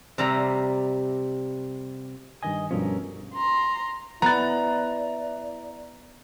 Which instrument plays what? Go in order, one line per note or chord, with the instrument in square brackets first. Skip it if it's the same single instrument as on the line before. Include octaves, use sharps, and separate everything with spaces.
[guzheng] C3 G3 E5 A#5
[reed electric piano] G2 D#3 G#5 [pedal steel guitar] D#5 D#6
[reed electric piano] G2 B2 F3 [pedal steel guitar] C#4 A4 A#4
[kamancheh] A#5 C6
[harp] B3 A6 [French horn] E4 [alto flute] D5 [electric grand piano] A#5 F#6